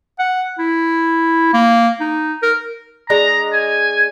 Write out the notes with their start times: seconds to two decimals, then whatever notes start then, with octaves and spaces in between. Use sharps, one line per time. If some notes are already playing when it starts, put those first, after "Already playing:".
0.19 F#5
0.59 E4
1.54 A#3
2.00 D#4
2.43 A#4
3.10 G#3 D4 D#5 A#5
3.54 G#5